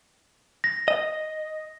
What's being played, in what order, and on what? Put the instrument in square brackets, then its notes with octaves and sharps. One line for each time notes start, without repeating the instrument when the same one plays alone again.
[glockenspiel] A#6
[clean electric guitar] D#5